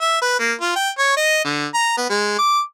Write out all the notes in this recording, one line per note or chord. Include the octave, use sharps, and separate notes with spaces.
E5
B4
A#3
F4
G5
C#5
D#5
D3
A#5
B3
G#3
D6